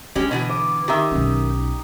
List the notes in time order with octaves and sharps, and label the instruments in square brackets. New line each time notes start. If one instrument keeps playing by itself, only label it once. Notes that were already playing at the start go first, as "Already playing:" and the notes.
[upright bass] D3 [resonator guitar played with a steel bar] G#3 C#4 G4
[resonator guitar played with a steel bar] B2 E3 B3
[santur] D6
[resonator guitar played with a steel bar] D#3 E5 [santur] D#4 G4
[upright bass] B1 C#4